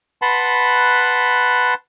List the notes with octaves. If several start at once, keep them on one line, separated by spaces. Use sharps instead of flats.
B4 F#5 A5 B5 C6